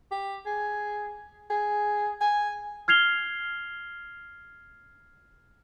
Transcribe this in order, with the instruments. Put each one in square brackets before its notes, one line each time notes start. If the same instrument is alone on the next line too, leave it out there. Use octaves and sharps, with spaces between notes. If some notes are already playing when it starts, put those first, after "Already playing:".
[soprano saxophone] G4
G#4
G#4
G#5
[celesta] F6 G#6 C7 F7 G7